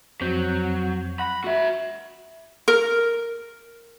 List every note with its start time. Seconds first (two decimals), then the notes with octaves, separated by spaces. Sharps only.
0.21 F2 F#3 C4 G6
1.19 F#5 B5 A#6
1.44 F#4 E5
2.68 A#4